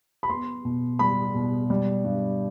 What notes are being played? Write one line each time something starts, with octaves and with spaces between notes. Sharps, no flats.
B5
B3 C6
B2
G3 B5
B2
G3
G2